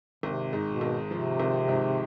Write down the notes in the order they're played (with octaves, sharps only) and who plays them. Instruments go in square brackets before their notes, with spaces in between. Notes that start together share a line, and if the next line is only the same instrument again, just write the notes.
[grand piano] G#1 [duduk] C3
[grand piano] G#2
[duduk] B2
[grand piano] G#1
[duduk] C3 [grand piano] F3
[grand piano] G#1
G#2